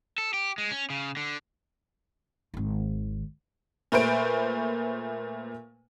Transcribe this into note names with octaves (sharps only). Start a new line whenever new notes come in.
A4
G4
G#3
C#4
C#3
D3
G#1 D#3
A#2 A3 B4 C5 D7